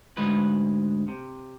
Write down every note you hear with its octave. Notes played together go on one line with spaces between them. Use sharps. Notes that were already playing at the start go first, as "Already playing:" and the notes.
D2 G#2 G#3 B4
C3